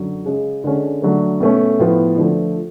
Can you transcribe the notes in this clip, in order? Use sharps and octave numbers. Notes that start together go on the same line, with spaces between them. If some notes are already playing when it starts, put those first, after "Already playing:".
Already playing: F#2 D3 F#3
C#3 G#3 C#4
D3 G#3 C#4
D3 F#3 A3
B2 A3 C#4
A2 F3 B3 F4
D3 F3 A3